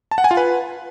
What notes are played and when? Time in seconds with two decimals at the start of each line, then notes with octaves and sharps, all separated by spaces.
0.11 A5
0.18 F#5
0.24 G#5
0.31 F4
0.37 B4